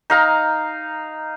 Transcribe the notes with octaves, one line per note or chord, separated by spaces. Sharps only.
D#4 F5 A#5